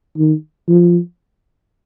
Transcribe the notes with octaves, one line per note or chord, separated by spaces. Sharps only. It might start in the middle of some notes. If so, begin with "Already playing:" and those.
D#3
F3